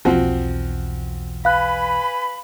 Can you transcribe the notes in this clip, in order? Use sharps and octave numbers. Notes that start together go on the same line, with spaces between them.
B1 E2 F3 C4 F#4
B4 F5 G#5 B5 F#6